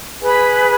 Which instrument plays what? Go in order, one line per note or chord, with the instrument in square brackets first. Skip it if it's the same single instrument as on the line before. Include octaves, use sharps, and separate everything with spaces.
[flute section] G#4 B4 G#5 B5